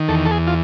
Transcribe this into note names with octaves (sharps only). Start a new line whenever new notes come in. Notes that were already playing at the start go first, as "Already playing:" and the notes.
Already playing: D#3
E2 A4
A4
G#4
F4